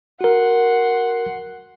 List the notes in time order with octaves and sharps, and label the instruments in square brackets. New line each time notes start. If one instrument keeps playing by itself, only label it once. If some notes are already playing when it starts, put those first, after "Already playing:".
[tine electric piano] F#4 A#4 [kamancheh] F#5 C6